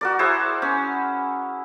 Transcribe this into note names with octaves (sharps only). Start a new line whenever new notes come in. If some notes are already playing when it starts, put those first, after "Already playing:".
F#4 A#4 D5
E4 G#4 C5
C#4